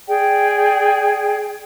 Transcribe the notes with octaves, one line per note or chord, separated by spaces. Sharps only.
G#4 D5 G5